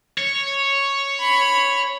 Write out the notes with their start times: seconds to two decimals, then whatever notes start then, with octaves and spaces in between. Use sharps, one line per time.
0.18 C#5
1.20 B5